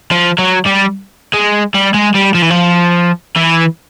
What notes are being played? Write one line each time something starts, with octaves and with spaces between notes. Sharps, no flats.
F3
F#3
G3
G#3
G3
G#3
G3
F3
E3
F3
E3